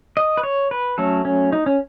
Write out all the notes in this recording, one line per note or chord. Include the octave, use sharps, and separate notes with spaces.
D#5
B4
C#5
B4
F#3 A3 C#4 A4
C#4
D#4
C#4